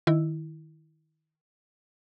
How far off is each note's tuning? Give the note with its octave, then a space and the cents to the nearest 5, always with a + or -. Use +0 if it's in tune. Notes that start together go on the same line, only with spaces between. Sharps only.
D#3 +0 E4 +0